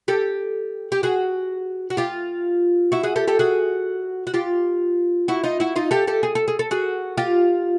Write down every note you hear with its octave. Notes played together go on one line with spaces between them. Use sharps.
G4 A4
G4
F#4 G#4
F#4
F4 G4
E4 F#4
F#4 G#4
G4 A4
G4 A4
F#4 G#4
F#4
F4 G4
E4 F#4
D#4 F4
E4 F#4
D#4 F4
G4 A4
G4 A4
G#4
A4
G#4
A4
F#4 G#4
F4 G4